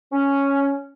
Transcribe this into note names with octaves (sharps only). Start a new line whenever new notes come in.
C#4